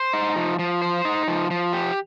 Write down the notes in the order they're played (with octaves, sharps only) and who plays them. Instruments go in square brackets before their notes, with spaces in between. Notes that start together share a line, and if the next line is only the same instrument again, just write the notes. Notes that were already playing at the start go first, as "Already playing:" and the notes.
Already playing: [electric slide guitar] C5
D#4
F3
F3
C5
D#4
F3
F3
G4